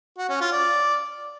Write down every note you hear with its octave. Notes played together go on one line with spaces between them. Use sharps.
F#4
C#4
F4
D5